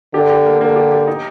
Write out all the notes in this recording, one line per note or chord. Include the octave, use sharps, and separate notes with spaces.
D3 G4
G4
A#3
D3 A#3
G4
G4
D#4